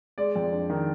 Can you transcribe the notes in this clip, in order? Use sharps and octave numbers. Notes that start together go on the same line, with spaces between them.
G#3 D5
F2
D4
D#3